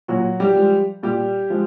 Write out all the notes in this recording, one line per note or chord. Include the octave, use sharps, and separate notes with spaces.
A#2 F#3 F#4
G3 G4
F3 G#3
A#2 G3 G4
F3 G#3